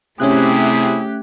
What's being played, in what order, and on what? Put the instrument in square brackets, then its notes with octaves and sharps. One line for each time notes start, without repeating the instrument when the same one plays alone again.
[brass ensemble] C3 E4 [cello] A3 G4 [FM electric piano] C#4 E5 F#6 [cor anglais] G#4